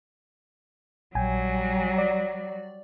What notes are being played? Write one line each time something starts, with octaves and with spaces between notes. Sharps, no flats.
A#1 F#3 G3 G5 G#5
D5